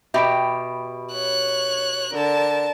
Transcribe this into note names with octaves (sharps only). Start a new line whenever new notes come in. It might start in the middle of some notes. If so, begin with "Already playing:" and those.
B2 G4 E5 G5 B5 D7
C#5 F#6
D3 A#4 A5